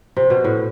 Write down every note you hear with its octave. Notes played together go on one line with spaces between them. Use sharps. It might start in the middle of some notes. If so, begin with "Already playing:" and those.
C3
B2
A2